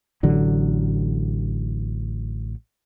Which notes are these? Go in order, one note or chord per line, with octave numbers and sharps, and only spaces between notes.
A1 D3 F#3